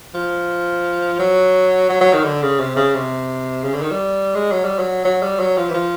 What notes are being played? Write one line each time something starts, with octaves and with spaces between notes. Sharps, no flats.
F3
F#3
F#3
F#3
D#3
D3
C#3
C3
C#3
C3
C#3
D3
D#3
G3
G#3
F#3
G3
F#3
F#3
G3
F#3
F3
E3
F3